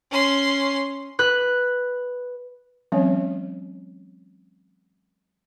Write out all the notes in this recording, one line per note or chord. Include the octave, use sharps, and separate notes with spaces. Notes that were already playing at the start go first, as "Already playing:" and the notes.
C#4 C6
B4 F#6
E3 F#3 G#3 C4 C#4 C#5